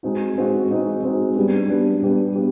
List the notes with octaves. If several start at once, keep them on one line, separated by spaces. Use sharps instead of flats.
G#3 C4 D#4 F#4
G#3 C4 D#4 F#4
G#3 C4 D#4 F#4
G#3 C4 D#4 F#4
G3 B3 D4 G4
G3 B3 D4 G4
G3 B3 D4 G4
B3 G4